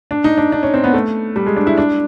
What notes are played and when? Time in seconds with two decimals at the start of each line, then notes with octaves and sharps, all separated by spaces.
0.11 D4
0.24 D#4
0.38 D4
0.52 D4
0.63 C#4
0.74 C4
0.84 B3
0.94 A3
1.36 G3
1.46 G#3
1.56 D4
1.67 E4
1.78 D4